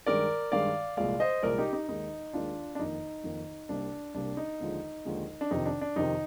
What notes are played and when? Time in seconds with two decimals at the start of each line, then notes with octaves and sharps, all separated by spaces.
0.06 G2 D#3 G#3 A#4 D5
0.52 G2 D#3 G#3 D5 F5
0.97 C2 A#2 F3 G#3 D5 F5
1.20 C5 D#5
1.43 C2 A#2 F3 G#3 A#4 D5
1.58 D#4 G4
1.73 D#4
1.88 D#2 D#3 G#3 D#4
2.33 D#2 D#3 G#3 D4 F4
2.75 D4
2.79 F2 D#3 A#3 D#4
3.24 F2 D#3 A#3
3.69 C2 C3 G3 A#3 D4
4.14 C2 C3 G3 A#3 D4
4.37 D#4
4.60 D#2 D3 F3 G#3
5.05 D#2 D3 F3 G#3
5.41 D4
5.51 F2 C3 D#3 D#4
5.66 D4
5.81 D4
5.96 F2 C3 D#3 D#4